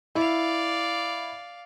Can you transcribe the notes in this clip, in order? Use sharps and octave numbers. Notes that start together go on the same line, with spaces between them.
E4 D5 F5